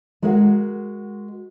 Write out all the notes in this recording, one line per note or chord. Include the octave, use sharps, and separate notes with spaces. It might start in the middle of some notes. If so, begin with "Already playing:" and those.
G#3 F#4 G#4 A#4 F5 F#5